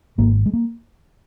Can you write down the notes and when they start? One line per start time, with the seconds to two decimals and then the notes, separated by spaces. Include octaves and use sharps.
0.18 G#1 G#2 A#3
0.46 G#3
0.53 A#3